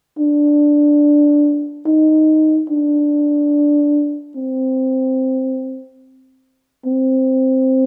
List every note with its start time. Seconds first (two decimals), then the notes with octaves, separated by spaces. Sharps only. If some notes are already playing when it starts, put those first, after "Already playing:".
0.19 D4
1.86 D#4
2.70 D4
4.36 C4
6.86 C4